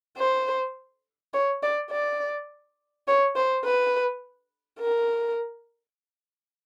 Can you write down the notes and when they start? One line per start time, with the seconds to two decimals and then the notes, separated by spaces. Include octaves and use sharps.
0.18 C5
1.34 C#5
1.63 D5
1.91 D5
3.07 C#5
3.36 C5
3.65 B4
4.80 A#4